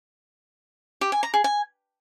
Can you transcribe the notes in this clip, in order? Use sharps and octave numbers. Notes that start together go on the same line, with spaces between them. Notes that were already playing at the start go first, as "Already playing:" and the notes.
G4
G#5
A#5
G#4
G#5